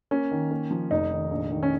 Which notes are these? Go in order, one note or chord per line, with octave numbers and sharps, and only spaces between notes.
A#3 C#4
D#3
A#3
F3
F1 D#4
D#3
A#1
D#3
C#4